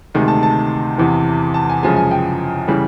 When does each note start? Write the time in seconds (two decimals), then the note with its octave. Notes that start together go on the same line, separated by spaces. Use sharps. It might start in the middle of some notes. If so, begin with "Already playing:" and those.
0.14 D2 C3 D#3 G#3
0.28 A5
0.43 A5
0.98 E2 C3 E3
1.54 A5
1.70 G#5
1.83 F#2 C#3 F3 G#3 G#5
1.96 G#5
2.11 G5
2.68 C#3 E3 G3